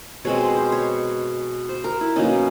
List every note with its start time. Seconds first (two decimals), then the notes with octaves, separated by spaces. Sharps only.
0.25 B2 G#3 C4 C#5
0.41 C5
0.57 C5
0.72 C#5
1.69 C5
1.84 A#4
2.01 E4
2.16 B2 F#3 A#3 C#4 D#4